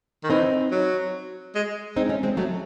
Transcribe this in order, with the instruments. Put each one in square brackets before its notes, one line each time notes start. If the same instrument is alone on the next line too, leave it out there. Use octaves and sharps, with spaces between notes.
[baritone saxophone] D#3
[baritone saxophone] E3 [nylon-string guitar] C4 D#4
[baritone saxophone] F#3
G#3
[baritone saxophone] G#3 [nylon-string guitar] C4 D#4
[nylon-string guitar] A3 C#4
G#3 C4
F#3 A3